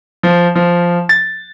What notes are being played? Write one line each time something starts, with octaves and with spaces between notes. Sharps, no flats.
F3
F3
A6